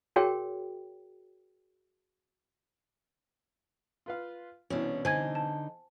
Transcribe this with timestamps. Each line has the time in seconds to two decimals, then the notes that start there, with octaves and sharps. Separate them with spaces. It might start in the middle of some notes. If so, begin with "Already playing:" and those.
0.16 F#4 G#4 A#4 C#5 G5
4.06 F4 B4 F5
4.70 C2 B2 E3 C#4 D4
5.05 D3 D#4 C5 G#5 G#6
5.35 A5